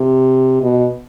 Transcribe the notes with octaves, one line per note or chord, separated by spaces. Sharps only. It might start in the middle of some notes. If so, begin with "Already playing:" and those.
Already playing: C3
B2